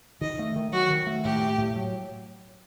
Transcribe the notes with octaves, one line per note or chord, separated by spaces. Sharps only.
D#3 D#5
A3
D#3
F#3 F#4
D#3
A3
A2 G4
A3
A2
F#3